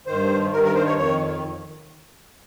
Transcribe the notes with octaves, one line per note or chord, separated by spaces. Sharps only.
G2 D#3 C5
G2 D#3 A#4
A#4
C5
C#5
F2 D#3 C#5